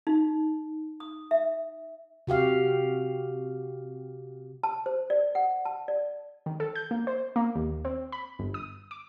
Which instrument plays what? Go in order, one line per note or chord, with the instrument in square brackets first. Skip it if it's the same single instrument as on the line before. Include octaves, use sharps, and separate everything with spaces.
[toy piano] D#4
D#6
E5
[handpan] C3 F#4 G4 F5
[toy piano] A5
C5
D5
F#5
A5
D5
[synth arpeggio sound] D#3
A4
G6
A#3
C5
A#3
D#2
C4
B5
G1
D#6
D6